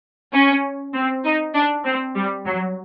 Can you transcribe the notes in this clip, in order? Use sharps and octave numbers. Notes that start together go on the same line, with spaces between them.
C#4
C4
D#4
D4
C4
G3
F#3